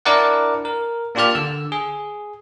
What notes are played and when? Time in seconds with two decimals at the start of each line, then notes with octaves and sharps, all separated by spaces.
0.06 D4 E4 A#4 D5 F#5
0.65 A#4
1.15 A#3 D4 F4 G4 D5 F6
1.35 D3 E6
1.72 G#4